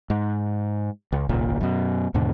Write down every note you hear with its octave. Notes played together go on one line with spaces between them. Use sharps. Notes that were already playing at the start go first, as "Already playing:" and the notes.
G#2
C#2
D#1 G#1 C#2 A#2
F#2 B2
D#2 G#2 B2 D3